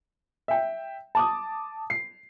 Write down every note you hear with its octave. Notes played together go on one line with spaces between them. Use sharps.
E5 G5
A5 D6 D#6
C7